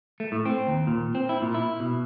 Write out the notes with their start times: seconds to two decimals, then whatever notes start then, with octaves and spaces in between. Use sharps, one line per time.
0.20 A3
0.32 A2
0.46 C4
0.67 D#2
0.87 A#2
1.15 C4
1.29 E4
1.42 A#2
1.54 E4
1.80 B2